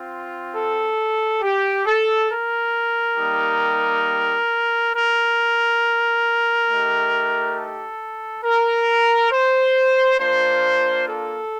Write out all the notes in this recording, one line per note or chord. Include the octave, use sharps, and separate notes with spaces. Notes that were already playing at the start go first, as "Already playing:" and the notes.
Already playing: C4 F4
A4
G4
A4
A#4
G3 A#3 D#4 G4
A#4
A3 D#4 G4
A4
A#4
C5
A#3 D4 F4 C5
A4